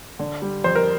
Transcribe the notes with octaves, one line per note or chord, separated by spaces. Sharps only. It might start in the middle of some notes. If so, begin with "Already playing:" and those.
D3
G3
F2 C5
A#4